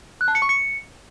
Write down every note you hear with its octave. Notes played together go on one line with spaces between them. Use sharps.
F#6
A5
C#7
C#6
C#7